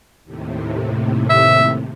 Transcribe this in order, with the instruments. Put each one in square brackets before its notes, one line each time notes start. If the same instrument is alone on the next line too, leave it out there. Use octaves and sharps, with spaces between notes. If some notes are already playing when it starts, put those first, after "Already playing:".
[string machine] D#2 A2 C3
[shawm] E5